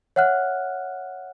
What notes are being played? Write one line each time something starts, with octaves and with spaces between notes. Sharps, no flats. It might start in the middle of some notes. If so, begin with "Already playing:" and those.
C#5 E5 F#5 F6 F#6